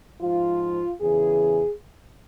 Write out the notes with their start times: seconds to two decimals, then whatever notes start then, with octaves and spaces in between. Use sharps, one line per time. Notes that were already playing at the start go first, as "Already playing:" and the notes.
0.21 G#2 F3 F4
1.00 E2 C#3 E3 G#4